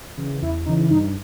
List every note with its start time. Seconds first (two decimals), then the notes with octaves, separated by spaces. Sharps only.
0.17 C#3 E3
0.41 E2 E4
0.66 C#3 E3 D#4
0.90 G2 D#4